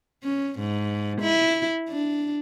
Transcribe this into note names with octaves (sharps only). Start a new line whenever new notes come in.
C#4
G#2
E4
D4